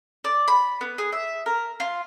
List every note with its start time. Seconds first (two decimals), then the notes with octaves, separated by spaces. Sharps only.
0.24 D5
0.48 B5
0.81 B3
0.98 G#4
1.12 E5
1.46 A#4
1.80 F4